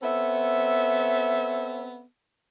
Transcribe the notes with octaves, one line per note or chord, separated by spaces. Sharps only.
B3 C4 A4 C#5 E5